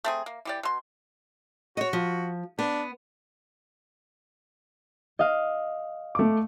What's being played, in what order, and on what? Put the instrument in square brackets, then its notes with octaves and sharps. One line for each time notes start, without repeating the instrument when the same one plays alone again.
[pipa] A3 C4 G#4
A#3
E3 G4 D5
B2 C6
[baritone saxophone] F#4 [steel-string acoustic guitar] C#5 D#5
[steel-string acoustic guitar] F3
[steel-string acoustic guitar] B3 [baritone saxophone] D4
[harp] D#5 F5
[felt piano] A3 D6